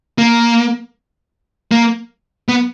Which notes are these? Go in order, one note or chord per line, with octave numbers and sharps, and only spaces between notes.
A#3
A#3
B3